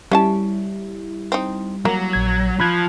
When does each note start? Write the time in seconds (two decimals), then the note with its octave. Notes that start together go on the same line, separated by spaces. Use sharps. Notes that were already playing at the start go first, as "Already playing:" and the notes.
0.12 G3 C#4 E4 F5 A5
1.32 C4 D#4
1.85 F#3 A#3
2.13 A#1 G#6
2.60 F3 B5 F#6 G#6